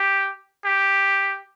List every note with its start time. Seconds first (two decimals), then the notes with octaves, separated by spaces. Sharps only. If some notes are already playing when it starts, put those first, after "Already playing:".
Already playing: G4
0.65 G4